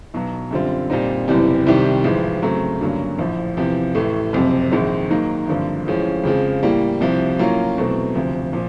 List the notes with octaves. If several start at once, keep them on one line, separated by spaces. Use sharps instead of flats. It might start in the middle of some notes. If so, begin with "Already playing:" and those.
B1 B2 F#3
F#2 D3 G3 C4 F4
A#2 G3 C4 D#4
F#1 E2 C3 E3 G3
C2 C3 D#3 G3
A1 G#2 F3 G#3
F2 C#3 F#3 A3 C4
G2 D3 F#3 A#3 C#4
A#1 A2 F3
E2 C3 F3
A1 A2 E3 A3
F#1 F2 C3
A#1 G#2 D#3 G#3 C4
G#2 D#3 F#3 A#3 D#4
G#1 G2 D3 F3 A#3
A1 A2 F3 G#3 C#4
F2 C#3 F3 G#3
A2 E3 G3 A#3
C2 C3 F3
A2 F#3 A#3 C#4 F4
E2 B2 F#3 A3 C4
D2 C3 F3
A#2 F3